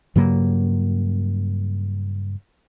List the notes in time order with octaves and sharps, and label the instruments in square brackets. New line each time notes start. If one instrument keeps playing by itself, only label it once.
[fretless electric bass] G2 C#3 F#3 A#3